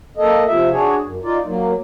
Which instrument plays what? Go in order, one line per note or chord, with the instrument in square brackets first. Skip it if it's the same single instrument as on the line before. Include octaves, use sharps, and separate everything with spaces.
[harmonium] A#3 A4 D#5
C3 F3 E5
D4 F#4 G#4 C#5
F#2
D#4 F4 D5
F#3 A#3